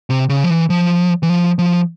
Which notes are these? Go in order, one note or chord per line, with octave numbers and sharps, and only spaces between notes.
C3
C#3
F3
E3
F3
E3
F3
F3